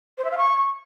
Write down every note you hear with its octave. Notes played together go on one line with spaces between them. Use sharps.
C5
E5
F5
C#6